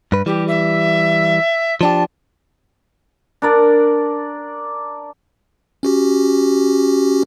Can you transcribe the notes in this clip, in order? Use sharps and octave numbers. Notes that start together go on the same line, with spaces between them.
G2 B4
E3 G3 G4
E5
F3 D4 G4 A5
D4 A#4 D5
C#4 F#4 G4